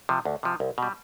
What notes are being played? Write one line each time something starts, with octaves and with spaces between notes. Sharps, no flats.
C3 F3
D2
C3 F3
C2
B2 G3